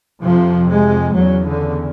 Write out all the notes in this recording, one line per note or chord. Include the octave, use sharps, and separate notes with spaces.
F2 C3 F3
G#3
E2 C#3 F#3
D3